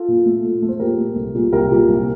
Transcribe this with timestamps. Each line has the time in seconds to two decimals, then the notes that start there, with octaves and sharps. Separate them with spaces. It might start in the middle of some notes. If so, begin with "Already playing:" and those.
Already playing: F4 A4
0.08 A#2
0.26 A3
0.44 A#2
0.62 A3
0.69 C5
0.80 A#2 G4 A#4
0.98 A3
1.16 C2
1.35 A#2 G3 A#3
1.52 C2 G4 A#4
1.71 A#2 G3 A#3
1.89 C2